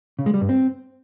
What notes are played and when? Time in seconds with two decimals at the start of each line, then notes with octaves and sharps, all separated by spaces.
0.19 C#3
0.26 G#3
0.34 G3
0.41 G2
0.49 C4